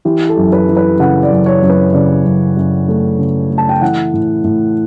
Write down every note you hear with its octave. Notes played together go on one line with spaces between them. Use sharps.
E3 G4
A4
F#2
B4
E3
B4
C#3 F#5
D5
F#2
C#5
F#2
B4
C#3 D5
F#2
F#2
A3
C#3
A3
A5
G5
E3 F#5
A2
A2